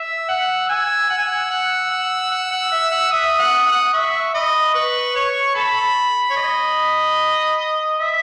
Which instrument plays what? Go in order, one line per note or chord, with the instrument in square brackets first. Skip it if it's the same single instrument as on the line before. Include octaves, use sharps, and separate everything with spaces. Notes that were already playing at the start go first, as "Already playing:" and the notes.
Already playing: [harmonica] E5 [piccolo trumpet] E6
[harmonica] F#5
[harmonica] G#5 [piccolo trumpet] E6
[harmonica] F#5
G#5
F#5
F#5
F#5
F#5
F#5
E5
F#5
[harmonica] E5 [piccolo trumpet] D#6
[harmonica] F#5
F#5
[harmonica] E5 [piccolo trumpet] C#6
[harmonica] D#5 [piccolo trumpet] B5
[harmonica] B4 [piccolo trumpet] C#6
[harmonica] C#5
[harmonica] A4 [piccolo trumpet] B5
[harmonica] C#5
D#5
E5